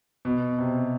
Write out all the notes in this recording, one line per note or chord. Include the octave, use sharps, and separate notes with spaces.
B2
C3